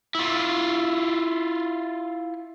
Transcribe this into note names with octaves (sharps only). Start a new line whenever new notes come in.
E4 F4